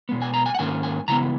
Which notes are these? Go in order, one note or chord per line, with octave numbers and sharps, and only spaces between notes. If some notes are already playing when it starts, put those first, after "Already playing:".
B2 G#3 B3
G#5
A#5
G#5
F#5
G#2 D#3 A#3 C#4 G#5
G#5
C#3 E3 G#3 B3 A#5